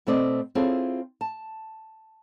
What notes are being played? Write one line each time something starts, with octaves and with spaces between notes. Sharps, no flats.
B2 A3 C4 D5 D#5
C4 E4 F4 G#4 A4 C#5
A5